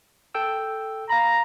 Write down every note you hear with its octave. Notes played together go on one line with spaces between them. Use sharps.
A4 G5 E6
F5 A#5 B5